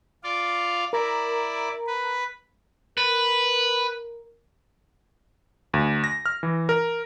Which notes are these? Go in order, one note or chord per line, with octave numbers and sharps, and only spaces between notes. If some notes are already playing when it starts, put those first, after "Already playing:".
F4 D5 F5
E4 A#4 D5 A#5
B4
A#4 B4
D2
A#6
F6
E3
A#4